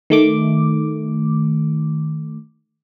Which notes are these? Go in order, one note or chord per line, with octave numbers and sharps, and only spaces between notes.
D#3 A3 D6